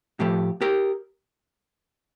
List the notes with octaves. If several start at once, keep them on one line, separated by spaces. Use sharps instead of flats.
A2 F3 A3 G4
G4 A#4